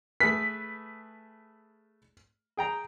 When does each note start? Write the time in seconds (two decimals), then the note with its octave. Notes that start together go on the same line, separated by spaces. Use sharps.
0.20 A3 G#4 B4 B6
2.57 G#4 G5 A#5